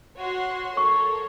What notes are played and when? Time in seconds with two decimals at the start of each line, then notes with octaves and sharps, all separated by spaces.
0.19 F#4 C#5 C6
0.77 A4 A#4 C#5 C#6